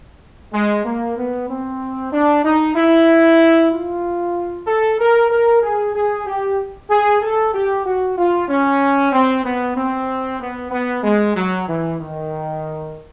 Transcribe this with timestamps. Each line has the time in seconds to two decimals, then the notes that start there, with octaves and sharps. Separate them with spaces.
0.53 G#3
0.85 A#3
1.17 B3
1.49 C4
2.12 D4
2.44 D#4
2.75 E4
3.71 F4
4.66 A4
4.99 A#4
5.30 A#4
5.62 G#4
5.94 G#4
6.26 G4
6.89 G#4
7.21 A4
7.53 G4
7.85 F#4
8.18 F4
8.48 C#4
9.13 C4
9.44 B3
9.76 C4
10.40 B3
10.71 B3
11.03 G#3
11.36 F#3
11.68 E3
11.99 D#3